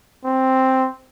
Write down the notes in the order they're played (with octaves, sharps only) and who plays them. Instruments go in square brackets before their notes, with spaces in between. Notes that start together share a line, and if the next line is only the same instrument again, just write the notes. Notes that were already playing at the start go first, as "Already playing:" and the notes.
[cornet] C4